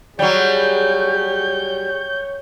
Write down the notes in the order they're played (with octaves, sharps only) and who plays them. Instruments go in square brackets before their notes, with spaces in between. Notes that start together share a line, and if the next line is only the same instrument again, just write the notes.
[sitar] F#3 G3 [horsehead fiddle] G#4 [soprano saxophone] C#5 [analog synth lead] G6